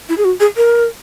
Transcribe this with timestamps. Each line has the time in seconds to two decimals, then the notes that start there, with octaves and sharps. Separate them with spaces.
0.09 E4
0.18 G#4
0.25 F#4
0.40 G#4
0.57 A#4